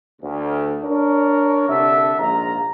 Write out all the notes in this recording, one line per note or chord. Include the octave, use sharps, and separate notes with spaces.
D2
D4 A#4 C#5
C2 D3 D4 E5
A#1 G#2 F4 A#5